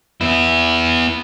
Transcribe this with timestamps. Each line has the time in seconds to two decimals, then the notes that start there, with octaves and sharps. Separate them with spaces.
0.21 B3 E4